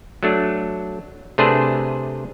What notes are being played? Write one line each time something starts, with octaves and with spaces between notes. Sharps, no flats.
F#3 A3 D4
C3 A3 D4 G#4 B4 C5